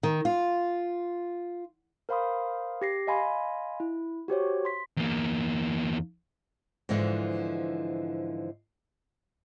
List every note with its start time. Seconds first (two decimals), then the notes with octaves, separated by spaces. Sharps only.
0.03 D#3
0.25 F4
2.09 A#4 C5 F5 B5 C6 D#6
2.81 G4 A#6 C7
3.07 D#5 F5 G#5 B5 C6
3.80 E4
4.28 F#4 G4 C5 C#5
4.65 C6 B6
4.97 E2 A#3
6.89 G#2 D3 E3 F3